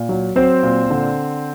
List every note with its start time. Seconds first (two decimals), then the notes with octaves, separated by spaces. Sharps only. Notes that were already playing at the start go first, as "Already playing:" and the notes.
Already playing: A#2
0.09 F#3
0.36 F#3 C4 C5
0.63 A#2
0.90 D3